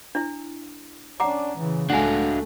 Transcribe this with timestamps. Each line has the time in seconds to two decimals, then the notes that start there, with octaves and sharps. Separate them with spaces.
0.15 D4 E4
1.20 C#4 D4 F#5 A#5 D6
1.58 C#3 E3
1.90 C#2 A3 D4 F#4 F5 F#5 G#5